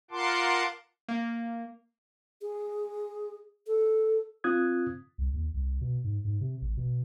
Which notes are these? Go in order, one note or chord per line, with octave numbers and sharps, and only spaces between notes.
F4 A#4 F#5 A5 C6 D6
A#3
G#4
A4
C4 F4 D#6 F#6 G#6
C2
D#2
C2
B2
G#2
G#2
C3
A1
B2